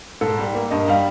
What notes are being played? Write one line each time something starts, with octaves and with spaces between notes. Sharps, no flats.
G#2 A4
G3
A#3
G2 D#5
G3 F5